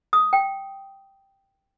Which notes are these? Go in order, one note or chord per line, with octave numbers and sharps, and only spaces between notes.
D#6
G5